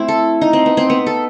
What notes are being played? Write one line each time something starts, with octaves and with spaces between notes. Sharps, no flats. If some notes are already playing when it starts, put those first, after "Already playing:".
Already playing: A3 C4 E4
A4
D#4
C4
B3
C4
B3
A4